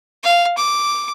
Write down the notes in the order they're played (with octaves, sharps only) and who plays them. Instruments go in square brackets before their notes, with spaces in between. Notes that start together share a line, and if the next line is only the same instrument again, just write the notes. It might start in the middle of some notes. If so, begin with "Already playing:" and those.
[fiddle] F5
D6